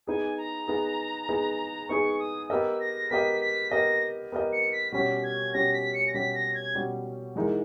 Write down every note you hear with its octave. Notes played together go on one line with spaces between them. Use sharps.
B3 D#4 G#4 G#5
A#5
B3 D#4 G#4
B3 D#4 G#4
B3 D#4 G#4 C#6
D#6
B3 G4 A#4 D#5 E6
A#6
B3 G4 A#4 D#5 B6
B6
B3 G4 A#4 D#5 A#6
B3 G4 A#4 D#5
C#7
B6
B2 G3 C#4 G4 B6
G#6
B2 G3 C#4 G4 A#6
B6
C#7
A#6
B2 G3 C#4 G4 B6
A#6
G#6
B2 G3 C#4 G4
E3 G#3 D#4 A#4